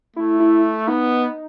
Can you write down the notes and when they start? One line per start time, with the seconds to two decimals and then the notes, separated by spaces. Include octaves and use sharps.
0.16 A3 E4
0.40 E4
0.87 B3 D#4